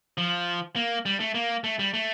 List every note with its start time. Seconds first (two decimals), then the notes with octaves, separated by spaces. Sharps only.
0.18 F3
0.76 A#3
1.06 G3
1.20 A3
1.34 A#3
1.64 A3
1.79 G3
1.94 A3